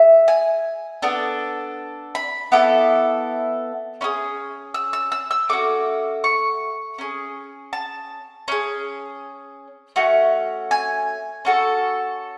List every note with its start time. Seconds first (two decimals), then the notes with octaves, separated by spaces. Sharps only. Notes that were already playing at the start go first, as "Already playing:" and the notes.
Already playing: G#4 E5
0.28 G#5
1.02 B3 D4 A4
2.15 B5
2.52 B3 E4 A4 D6
4.01 C#4 E4 G#4
4.74 E6
4.93 E6
5.12 E6
5.31 E6
5.49 A3 C#4 F#4 D6
6.24 C#6
6.98 C#4 G#4
7.73 A5
8.48 C#4 G#4
9.96 A3 C#4 F#4
10.71 G#5
11.45 C#4 F#4 A4